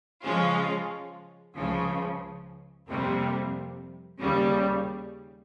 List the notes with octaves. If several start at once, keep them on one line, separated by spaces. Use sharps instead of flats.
C#3 F3 G#3 C#4 F4
C#2 C#3 F3
F2 C3 G3 A#3
D#2 C#3 G3